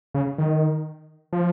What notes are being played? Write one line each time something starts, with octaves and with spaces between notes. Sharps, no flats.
C#3
D#3
F3